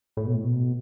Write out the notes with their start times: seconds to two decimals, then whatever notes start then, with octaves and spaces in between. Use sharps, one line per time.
0.17 A2
0.26 B2
0.34 A2
0.44 B2